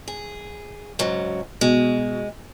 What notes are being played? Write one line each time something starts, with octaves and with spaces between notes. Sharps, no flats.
G#4
G#2 C#3 F#3
B2 G#3